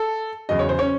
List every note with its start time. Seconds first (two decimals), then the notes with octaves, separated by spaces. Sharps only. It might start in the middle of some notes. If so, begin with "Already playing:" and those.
Already playing: A4
0.49 E2 C#3 F#3 D#5
0.59 C#5
0.69 C5
0.79 C#4 C#5